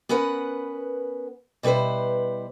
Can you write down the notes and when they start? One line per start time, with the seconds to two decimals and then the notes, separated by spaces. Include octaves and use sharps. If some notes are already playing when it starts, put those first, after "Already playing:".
0.09 B3 C#4 A#4 B4 F#5
1.63 B2 G3 E4 B4 C5